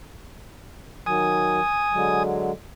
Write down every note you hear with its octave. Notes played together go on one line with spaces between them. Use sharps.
D#3 F#3 G#5 D#6
D3 F#3 G#3